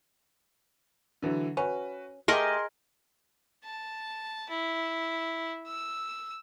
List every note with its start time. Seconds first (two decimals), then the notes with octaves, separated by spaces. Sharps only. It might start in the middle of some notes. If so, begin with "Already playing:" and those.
1.22 D3 E3 F#3
1.57 C#4 F#4 B4
2.28 A3 G4 G#4 A#4 D#5 C6
3.64 A5
4.49 E4
5.67 E6